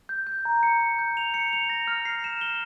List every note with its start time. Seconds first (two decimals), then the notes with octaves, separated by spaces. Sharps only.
0.09 G6
0.27 G6
0.45 A#5
0.63 C#7
0.81 C#7
0.99 G6
1.17 F7
1.34 C#7
1.53 F7
1.70 A#6
1.88 F6
2.05 C7
2.24 E7
2.41 G7